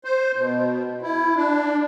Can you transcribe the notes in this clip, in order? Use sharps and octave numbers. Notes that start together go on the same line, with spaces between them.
C5
B2
E4
D4